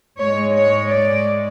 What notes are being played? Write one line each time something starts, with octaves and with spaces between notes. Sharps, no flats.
G#2 G#3 C#5
C#5
D5